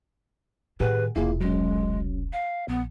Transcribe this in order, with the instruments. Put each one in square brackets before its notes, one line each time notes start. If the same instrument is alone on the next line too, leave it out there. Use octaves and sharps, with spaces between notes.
[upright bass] A2 D#3 [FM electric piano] G4 G#4 F#5 [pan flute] B4
[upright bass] E1 C2 [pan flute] A#3 [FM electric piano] E4 F4 G#4
[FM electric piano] F#3 C#4 [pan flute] G#3
[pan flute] F5
[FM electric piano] A#1 [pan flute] B3